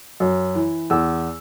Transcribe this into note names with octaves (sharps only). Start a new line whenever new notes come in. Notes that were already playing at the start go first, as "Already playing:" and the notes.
F#2
E3
E2 E6